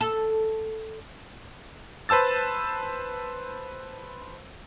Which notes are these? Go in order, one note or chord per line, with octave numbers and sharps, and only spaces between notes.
A4
B4 C5 A5 E6 A6